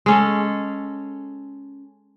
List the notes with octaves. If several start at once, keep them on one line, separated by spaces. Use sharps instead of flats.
G#3 C#4 A4